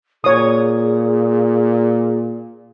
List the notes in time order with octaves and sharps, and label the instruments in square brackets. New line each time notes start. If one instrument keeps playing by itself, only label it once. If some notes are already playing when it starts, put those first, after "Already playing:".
[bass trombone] A#2 [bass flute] G#4 [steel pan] C#5 D#6